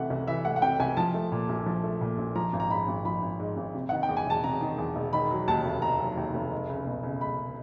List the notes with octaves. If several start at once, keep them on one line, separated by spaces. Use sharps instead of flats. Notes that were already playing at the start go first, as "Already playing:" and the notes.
Already playing: C3 E3 A3 F#5
C2
E3 E5
A3 F#5
F#5
C3 G5
C2 G#5
F3 A5
A3
A#2
A#1
F3
A3
A#2
A#1
F3 A#5
G#1
A#5
G#2 B5
G#1
F3 B5
G#1
G#2
G#1
C3
D#3 F#5
G5
E2
G#5
E1 A5
C3 A#5
D#3
E2
E1
D#3 B5
F#3
D#2 A5
F1
D#3 A#5
F#3
D#2
F1
G#3
C#2
B2
C#2
G#3 B5